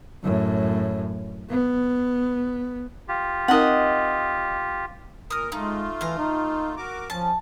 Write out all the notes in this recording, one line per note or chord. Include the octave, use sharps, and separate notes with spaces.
F#2 A2
B3
F4 G4
C4 D#4 A#4 D#5 F#5
A#2 A#4 D#6 F6
G#3 A3 D#4 F4
E3 F5 A#5
D#4
F#4 A#4 D6
F3 C#4 A5